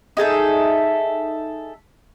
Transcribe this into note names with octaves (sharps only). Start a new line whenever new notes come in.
D#4 G#4 A4 E5